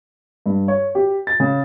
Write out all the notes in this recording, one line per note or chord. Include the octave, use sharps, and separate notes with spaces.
G2
C#5
G4
A6
C#3